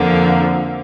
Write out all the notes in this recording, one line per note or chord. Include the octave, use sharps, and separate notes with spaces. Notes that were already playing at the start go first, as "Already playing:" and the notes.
Already playing: F2 D3 F3 A#3